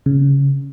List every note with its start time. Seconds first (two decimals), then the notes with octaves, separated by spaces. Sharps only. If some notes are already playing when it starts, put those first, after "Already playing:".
0.06 C#3